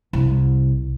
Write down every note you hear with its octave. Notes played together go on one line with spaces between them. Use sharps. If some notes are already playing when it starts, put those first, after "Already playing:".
C2